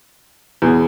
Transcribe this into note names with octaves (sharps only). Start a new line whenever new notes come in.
E2 B2 G#4